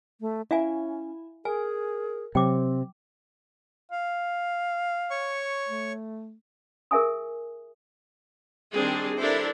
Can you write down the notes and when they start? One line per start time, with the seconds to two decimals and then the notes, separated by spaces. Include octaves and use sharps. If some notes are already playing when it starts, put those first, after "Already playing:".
0.21 A3
0.51 C#4 E4 E5 F5 G#5
1.45 G#4 A#4 G#5
2.35 C3 F#3 C4 G5 D6
3.92 F5
5.10 C#5 C#6
5.69 A3
6.91 G#4 A#4 E5 G#5 D#6
8.73 D#3 G3 C4 D4 G#4
9.20 D4 E4 G4 A4 A#4 C5